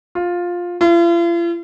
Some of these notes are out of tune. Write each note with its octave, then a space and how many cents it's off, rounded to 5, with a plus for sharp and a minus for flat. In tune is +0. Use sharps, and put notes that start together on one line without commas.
F4 +10
F4 -45